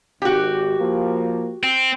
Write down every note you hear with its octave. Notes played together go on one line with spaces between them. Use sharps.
G#1 F#4 G4
F3 A#3
C4